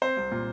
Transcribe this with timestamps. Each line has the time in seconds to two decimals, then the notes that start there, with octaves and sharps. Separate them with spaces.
0.02 C4 C5
0.17 C2
0.32 A#2